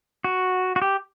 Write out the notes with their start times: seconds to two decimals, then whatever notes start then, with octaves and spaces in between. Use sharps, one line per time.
0.24 F#4
0.76 F#4
0.82 G4